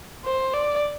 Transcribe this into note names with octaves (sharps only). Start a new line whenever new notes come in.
C5
D5